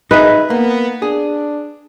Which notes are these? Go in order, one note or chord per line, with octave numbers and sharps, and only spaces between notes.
D#4 G#4 B4 E5
A#3 B3
D4 G#4